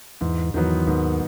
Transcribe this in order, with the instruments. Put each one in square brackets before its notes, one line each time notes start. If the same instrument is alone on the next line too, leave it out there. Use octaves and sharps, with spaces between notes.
[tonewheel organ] E2 E3 [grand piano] G#2
[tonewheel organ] E2 E3 [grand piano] D#3 F#3 B3
[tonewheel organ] D#2 D#3 [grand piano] G#2